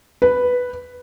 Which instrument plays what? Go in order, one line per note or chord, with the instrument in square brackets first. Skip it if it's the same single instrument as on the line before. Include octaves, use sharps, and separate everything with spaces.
[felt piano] B4